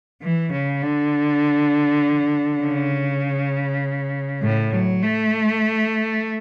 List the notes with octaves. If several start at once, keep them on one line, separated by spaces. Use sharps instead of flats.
E3
C#3
D3
C#3
A2
F#3
A3